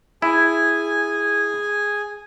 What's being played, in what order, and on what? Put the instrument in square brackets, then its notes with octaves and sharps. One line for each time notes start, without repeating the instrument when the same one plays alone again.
[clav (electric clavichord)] E4 [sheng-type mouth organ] G#4 G#5